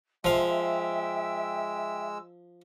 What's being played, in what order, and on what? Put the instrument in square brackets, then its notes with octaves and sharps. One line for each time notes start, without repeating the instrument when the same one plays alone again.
[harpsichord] F3 F5 [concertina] G#3 E6 [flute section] E5 G5